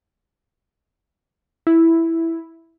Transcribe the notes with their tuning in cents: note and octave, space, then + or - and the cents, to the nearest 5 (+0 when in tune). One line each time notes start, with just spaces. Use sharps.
E4 +0